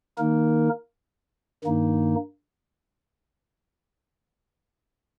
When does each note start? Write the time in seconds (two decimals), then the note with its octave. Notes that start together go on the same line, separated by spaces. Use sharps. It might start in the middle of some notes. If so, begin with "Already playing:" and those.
0.18 D#3 A#3 D#4 A#4
1.65 G2 D#3 A#3 D#4